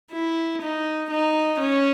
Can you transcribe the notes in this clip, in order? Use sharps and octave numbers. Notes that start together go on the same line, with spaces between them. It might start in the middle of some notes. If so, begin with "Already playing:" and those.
E4
D#4
D#4
C#4